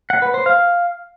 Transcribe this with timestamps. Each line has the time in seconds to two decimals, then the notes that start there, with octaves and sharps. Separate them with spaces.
0.10 F#5
0.22 B4
0.34 C5
0.46 F5